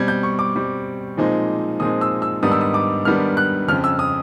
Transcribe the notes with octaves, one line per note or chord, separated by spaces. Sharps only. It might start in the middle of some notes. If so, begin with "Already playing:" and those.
Already playing: B2 G3 C4 G#6
G6
C#6
D6
B2 G3 C4
A#2 F3 G#3 C4 D#4
A#2 F3 G#3 C4 D#4 D#6
E6
E6
G#2 D#3 G3 B3 D4 D#6
E6
D#6
D6
G#2 D#3 G3 B3 D4 F6
F#6
F2 C#3 F3 F6
E6
D#6